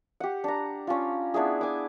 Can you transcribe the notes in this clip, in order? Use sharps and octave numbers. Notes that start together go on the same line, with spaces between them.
G4 F#5
D4 A#5
C#4 D4 F4
B3 D4 E4 G#4
G#5 D6